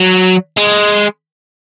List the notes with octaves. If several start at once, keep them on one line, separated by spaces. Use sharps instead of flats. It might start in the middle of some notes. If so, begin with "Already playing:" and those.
Already playing: F#3
G#3